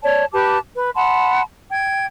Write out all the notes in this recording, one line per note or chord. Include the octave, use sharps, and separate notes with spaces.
C#5 D5 A5
G4 B4 A5 D6
B4
F#5 A5 B5 C6
G5 G#6